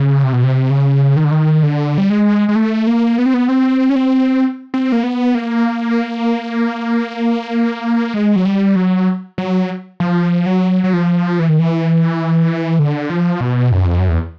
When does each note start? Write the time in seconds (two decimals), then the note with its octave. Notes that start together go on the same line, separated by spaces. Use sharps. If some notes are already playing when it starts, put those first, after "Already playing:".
Already playing: C#3
0.24 C3
0.33 B2
0.44 C3
0.70 C#3
1.16 D#3
1.24 D3
1.31 D#3
1.63 D3
1.98 G3
2.10 G#3
2.49 G#3
2.56 A3
2.87 A#3
3.18 B3
3.26 C4
3.34 B3
3.49 C4
3.90 C#4
3.96 C4
4.74 C4
4.92 A#3
5.03 B3
5.35 A#3
8.14 G#3
8.36 F#3
8.45 G3
8.76 F#3
9.38 F#3
10.00 F3
10.46 F#3
10.84 F#3
10.93 F3
11.39 E3
11.49 D#3
11.59 E3
12.79 D3
13.10 F3
13.41 B2
13.72 F#2
13.85 F2
13.98 F#2
14.08 E2